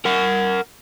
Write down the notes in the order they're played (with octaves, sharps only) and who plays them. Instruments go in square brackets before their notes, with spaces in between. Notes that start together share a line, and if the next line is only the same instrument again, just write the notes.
[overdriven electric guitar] A#4 F#5